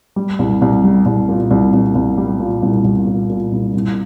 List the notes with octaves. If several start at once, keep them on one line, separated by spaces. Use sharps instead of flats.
G3
C2
C2
G3
C2
A#2
C2
C2
C2
G3
A#2
C2
C2
A#2
A#2
C2
C2